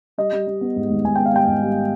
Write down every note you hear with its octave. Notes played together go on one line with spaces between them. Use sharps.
G3 D#5
G3
G3
B3
G#2
G#1
G#1 G#5
B3 G5
F5
G3 G5
G#1
G3